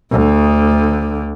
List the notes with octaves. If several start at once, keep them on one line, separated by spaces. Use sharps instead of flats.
D2 D3